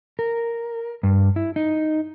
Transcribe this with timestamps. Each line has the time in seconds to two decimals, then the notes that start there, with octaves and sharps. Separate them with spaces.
0.19 A#4
1.03 G2
1.36 E4
1.56 D#4